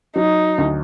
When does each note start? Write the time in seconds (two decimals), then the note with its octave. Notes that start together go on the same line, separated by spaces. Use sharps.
0.16 F#3 D#4
0.58 D2